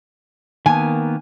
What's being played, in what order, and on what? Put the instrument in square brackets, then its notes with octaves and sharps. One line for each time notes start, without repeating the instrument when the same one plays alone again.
[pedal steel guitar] D#3 A#3 B3 [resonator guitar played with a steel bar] G#5